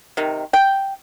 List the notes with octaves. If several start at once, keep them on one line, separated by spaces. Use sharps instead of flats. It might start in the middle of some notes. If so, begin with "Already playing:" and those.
C3 D#3
G5